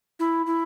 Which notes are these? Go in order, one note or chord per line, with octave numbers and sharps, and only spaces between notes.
E4
E4